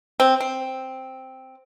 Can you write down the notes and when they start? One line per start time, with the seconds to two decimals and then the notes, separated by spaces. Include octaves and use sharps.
0.20 C4
0.40 C4